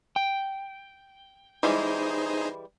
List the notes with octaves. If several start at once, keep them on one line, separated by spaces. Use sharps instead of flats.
G5
E3 G3 G#3 D#4 G#4 C5